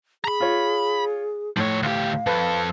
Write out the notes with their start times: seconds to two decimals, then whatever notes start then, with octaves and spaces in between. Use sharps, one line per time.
0.24 G#4 A#5 B5
0.40 F4 C#5
1.57 A2 F3 C#5
1.83 D2 G4 F5
2.27 F2 A4 B4